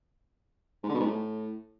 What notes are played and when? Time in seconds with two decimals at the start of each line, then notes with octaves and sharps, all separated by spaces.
0.84 G#2
0.89 D3
0.95 B2
1.00 G#2
1.06 A2